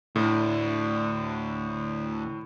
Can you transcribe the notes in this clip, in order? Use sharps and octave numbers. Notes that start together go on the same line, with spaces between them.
D2 A2